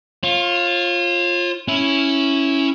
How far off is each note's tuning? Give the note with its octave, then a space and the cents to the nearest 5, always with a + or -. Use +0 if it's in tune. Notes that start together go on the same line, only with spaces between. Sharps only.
F4 +5 C#5 -35
C#4 +0 E4 +0